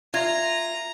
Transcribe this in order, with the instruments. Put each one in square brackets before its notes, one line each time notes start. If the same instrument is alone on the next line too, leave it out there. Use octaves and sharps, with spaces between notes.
[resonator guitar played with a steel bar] F4 [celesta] E5 G#6 [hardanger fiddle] A#5